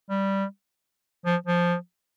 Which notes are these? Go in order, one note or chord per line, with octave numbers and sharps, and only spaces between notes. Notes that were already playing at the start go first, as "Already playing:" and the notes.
G3
F3
F3